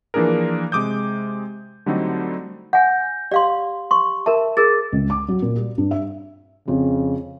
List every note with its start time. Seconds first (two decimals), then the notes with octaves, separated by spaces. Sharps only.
0.14 E3 F3 A#3 D4 G#4 A#4
0.72 C3 G#3 D6 D#6 G6
1.86 D3 F#3 G3 A3 C4 D#4
2.73 F#5 G#5 G6 A#6
3.31 G4 D5 F5 C6
3.91 C6 C#6
4.26 A#4 E5 A5
4.57 G#4 A#4 A6
4.92 C#2
5.10 D6
5.28 F#3
5.42 A#2
5.56 G3
5.78 G2
5.91 E5
6.68 F2 C#3